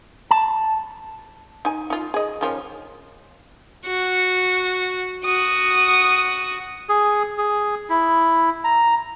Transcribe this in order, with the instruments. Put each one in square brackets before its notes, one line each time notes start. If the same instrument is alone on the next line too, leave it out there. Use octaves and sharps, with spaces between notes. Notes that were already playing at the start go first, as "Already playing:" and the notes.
[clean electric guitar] A5
[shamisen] D#4 G#5
D#4 F4
G#4 D#5
D#3 F3 C#4
[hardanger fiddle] F#4
F#4 D#6
[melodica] G#4
G#4
E4
A#5